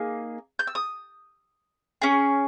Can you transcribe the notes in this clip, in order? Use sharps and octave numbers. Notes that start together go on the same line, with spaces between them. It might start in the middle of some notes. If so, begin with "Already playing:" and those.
Already playing: A#3 D#4 G#4
G6
E6
D#6
C#4 G#4